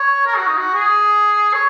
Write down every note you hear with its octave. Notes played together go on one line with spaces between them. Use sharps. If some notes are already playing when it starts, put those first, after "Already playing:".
Already playing: C#5
A#4
F#4
D#4
F#4
G#4
C#5